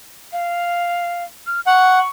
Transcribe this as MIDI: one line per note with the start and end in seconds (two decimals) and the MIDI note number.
0.33 1.24 77
1.47 1.61 89
1.67 1.99 78
1.67 2.09 85